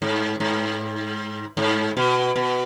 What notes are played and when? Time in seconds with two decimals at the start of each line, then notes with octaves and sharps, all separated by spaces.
0.02 G#2
0.40 G#2
1.57 G#2
1.97 B2
2.36 B2